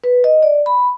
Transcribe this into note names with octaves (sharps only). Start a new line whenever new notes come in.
B4
D#5
D5
B5